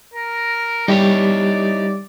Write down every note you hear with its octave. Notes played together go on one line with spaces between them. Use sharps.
A#4
G3 D#4 E4 G4 C#5 D5